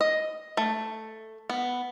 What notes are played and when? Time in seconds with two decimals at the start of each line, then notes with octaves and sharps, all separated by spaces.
0.01 D#5
0.57 A3
1.50 B3